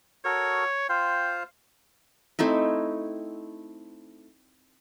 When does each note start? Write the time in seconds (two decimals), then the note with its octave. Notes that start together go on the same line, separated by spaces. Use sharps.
0.25 F#4 A4 A#4 C#5
0.89 F4 C5 F5 G5
2.39 A3 C4 D#4 E4